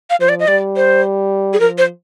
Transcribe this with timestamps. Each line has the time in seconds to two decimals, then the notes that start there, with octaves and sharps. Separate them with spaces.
0.10 F5
0.20 F3 C5
0.29 D5
0.40 D#5
0.48 G3 D5
0.76 C5
1.53 G#4
1.60 F3 A#4
1.78 C5